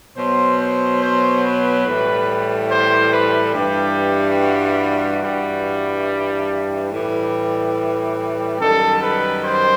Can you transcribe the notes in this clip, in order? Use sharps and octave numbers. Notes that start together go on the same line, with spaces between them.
B2 F#3 C5
C5
C5
B4
A2 E3 G3
C5
B4
G2 E3 G3 G4
F#4
G2 E3 G3
A2 E3 G3
F#2 D#3 G3 A4
B4
C5